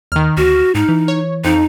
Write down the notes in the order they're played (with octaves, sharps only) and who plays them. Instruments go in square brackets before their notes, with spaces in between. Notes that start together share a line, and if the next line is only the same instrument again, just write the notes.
[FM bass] D#2 [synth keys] D#3 F6
[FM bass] D2 [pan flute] F#4 [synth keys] F6
[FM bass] G#2 [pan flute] D#4
[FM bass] E3
[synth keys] C#5
[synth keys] F2 [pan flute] D#4